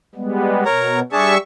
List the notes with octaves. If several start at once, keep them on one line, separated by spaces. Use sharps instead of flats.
G3 G#3 B3
B2 A#4 C#5 A#5
G3 D4 G#4 E5 A5 C#6